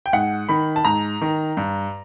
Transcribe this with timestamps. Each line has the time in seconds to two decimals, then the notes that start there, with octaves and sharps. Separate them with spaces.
0.06 G5
0.13 G#2 F#5
0.49 D#3 B5
0.76 A5
0.85 G#2 A#5
1.22 D#3
1.57 G2